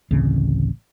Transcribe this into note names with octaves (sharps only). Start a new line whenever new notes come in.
A1 D2 C#3 C4